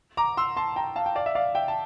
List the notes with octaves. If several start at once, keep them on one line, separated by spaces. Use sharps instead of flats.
A#5 D6
C6 E6
A5 C6
G5 A#5
F5 A5
G5
D5 F5
E5
D5 F5
E5 G5
A5